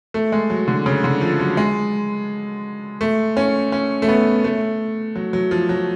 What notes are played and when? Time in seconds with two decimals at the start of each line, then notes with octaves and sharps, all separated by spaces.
0.14 A3
0.32 G#3
0.50 F#3
0.68 D3
0.86 C#3
1.04 D3
1.21 F3
1.40 F#3
1.57 G#3
3.01 A3
3.37 C#4
3.72 C#4
4.02 A3
4.08 B3
4.44 A3
5.16 F#3
5.33 F#3
5.51 F3
5.69 F#3